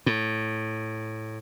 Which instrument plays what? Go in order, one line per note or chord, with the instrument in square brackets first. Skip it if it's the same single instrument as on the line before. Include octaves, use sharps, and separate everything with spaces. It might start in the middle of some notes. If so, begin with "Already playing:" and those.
[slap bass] A2